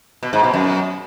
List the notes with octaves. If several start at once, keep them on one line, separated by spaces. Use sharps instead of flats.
B2
G#2
B2
F#2